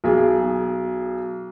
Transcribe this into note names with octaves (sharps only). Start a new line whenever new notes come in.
B1 G#4